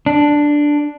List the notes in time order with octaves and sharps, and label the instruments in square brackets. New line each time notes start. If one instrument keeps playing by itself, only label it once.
[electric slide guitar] D4